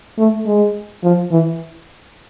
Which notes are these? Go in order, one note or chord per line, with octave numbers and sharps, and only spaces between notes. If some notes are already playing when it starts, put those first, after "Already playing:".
A3
G#3
F3
E3